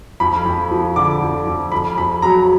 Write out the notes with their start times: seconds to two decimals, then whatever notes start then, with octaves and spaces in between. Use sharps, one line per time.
0.20 F2 B5
0.46 F2
0.71 F3
0.96 D3 D6
1.22 F2
1.47 F2
1.72 F2 B5
1.97 F2 B5
2.22 F#3 A#5